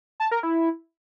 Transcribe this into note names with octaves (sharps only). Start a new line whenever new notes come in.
A5
A#4
E4